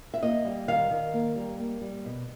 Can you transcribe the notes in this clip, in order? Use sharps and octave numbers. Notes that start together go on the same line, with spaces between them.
E5
A#3 D#5
G3
D#3 F5
D#3
A#3
G3
A#3
G3
B2